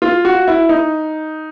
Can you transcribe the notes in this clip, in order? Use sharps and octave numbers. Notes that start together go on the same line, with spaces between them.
F4
F#4
E4
D#4